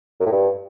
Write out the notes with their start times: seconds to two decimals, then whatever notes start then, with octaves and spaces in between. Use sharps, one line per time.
0.20 F#2
0.26 A2
0.31 G2